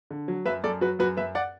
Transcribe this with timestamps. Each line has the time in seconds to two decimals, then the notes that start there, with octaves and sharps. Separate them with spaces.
0.11 D3
0.28 F#3
0.46 F#2 B4 E5
0.64 F#2 A4 D5
0.81 F#3 F#4 B4
0.99 F#2 F#4 B4
1.17 F#2 B4 E5
1.35 D5 F#5